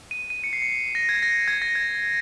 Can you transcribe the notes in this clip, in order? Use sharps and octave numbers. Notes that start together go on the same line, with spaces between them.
D#7
D#7
C#7
C7
C#7
A#6
G#6
A#6
G#6
A#6
G#6